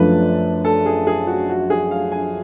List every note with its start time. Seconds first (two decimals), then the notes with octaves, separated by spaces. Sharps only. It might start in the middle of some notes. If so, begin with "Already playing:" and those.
Already playing: F#2 F3 A3 D4 B4
0.65 A4
0.86 G#4
1.07 G#4
1.27 F#4
1.49 F#4
1.70 G#4
1.91 F5
2.12 G#5